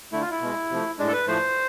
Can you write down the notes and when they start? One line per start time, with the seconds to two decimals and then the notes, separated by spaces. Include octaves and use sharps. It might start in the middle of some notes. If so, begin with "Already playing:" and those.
0.12 D3 A3 E4
0.21 F4
0.31 E4
0.41 B2 G#3
0.70 C3 F3 A3
0.99 A2 G#3 D4
1.08 A4
1.13 B4
1.27 A2 F3 A3 C5